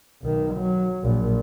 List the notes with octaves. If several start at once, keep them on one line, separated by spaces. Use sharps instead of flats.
B1 D#3
F#3
A#1 A#2